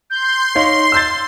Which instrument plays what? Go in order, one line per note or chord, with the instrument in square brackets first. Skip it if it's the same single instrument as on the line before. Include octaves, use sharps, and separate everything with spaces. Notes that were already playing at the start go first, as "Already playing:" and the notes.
[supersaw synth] C6 [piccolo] G6
[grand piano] D#4 C#5 F5 [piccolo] C7
[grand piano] E6 G6 A6